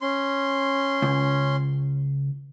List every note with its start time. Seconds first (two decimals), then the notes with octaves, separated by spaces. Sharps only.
0.01 C#4 C6
1.02 C#2